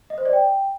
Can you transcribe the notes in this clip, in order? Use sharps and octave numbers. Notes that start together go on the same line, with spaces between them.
D#5
C5
D5
G5